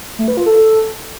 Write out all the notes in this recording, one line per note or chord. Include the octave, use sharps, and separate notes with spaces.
A3
B4
F4
A4